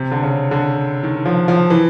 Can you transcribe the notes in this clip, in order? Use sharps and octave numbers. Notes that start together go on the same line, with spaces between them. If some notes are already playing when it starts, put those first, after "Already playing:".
Already playing: C3
D3
C#3
D3
D#3
F3
F3
E3